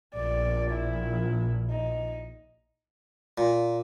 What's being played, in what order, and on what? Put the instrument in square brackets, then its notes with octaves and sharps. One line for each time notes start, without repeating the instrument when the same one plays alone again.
[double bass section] A#1 [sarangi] D5
[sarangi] E4
D#4
[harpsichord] A#2